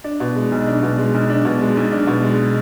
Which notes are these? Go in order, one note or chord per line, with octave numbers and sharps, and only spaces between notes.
D4
B2
G#3
B1
D4
B2
G#3
B1
D4
B2
G#3
B1
D4
B2
G#3